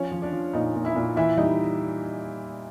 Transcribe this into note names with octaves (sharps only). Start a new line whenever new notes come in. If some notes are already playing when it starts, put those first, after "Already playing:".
Already playing: F3 C#4 C#5
F3
D4 D5
F3
A#2 D#4 D#5
A#2
E4 E5
A#2
E3 E4 E5
G3 D#4 D#5